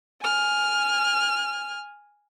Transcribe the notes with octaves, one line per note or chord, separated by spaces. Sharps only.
G#5 F6